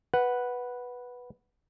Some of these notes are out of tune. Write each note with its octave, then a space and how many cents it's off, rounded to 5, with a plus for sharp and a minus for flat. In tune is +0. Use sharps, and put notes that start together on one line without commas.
B4 -5 F#5 +0